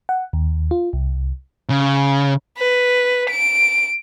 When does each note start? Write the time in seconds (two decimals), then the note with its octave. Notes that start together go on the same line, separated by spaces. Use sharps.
0.09 F#5
0.33 D#2
0.71 F4
0.93 C2
1.70 C#3
2.58 B4
3.30 D7